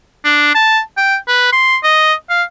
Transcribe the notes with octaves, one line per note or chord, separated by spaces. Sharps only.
D4
A5
G5
B4
C6
D#5
F5